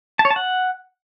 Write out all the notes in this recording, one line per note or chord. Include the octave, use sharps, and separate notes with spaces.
A5
C#5
A5
F#5